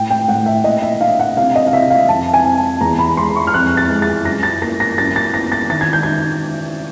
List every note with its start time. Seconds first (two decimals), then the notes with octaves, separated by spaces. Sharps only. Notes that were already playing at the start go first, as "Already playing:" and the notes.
Already playing: A2 G5
0.10 G5
0.28 A2 F#5
0.46 E5
0.64 A#2 D#5
0.82 E5
1.00 D4 F5
1.19 F#5
1.37 C3 F5
1.55 D#5
1.67 F5
1.73 C3 E5
1.90 F5
2.08 F2 A5
2.34 G#5
2.45 C4
2.58 A5
2.81 E2 A#5
2.99 B5
3.17 G#3 C6
3.36 C#6
3.47 F6
3.54 F2 F#6
3.77 A6
3.90 G#3
4.02 A6
4.25 F#2 A#6
4.43 A6
4.62 A#3 A#6
4.80 A#6
4.98 F#2 A6
5.16 A6
5.34 B3 A#6
5.52 A6
5.70 D#3 A6
5.81 G#6
5.93 G6
6.03 D#4 G#6